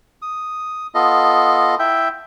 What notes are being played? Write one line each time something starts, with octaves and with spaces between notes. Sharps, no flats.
D#6
B3 F4 A4 D#5
E4 E5 G5